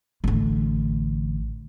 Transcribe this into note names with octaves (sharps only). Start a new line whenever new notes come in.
A1 D3